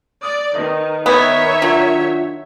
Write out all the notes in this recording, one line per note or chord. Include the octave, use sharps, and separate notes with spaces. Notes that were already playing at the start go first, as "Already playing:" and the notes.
D5 D#6
D#3 B4 D#5
D#3 B3 C#5 E5
F#3 D4 F4 F#5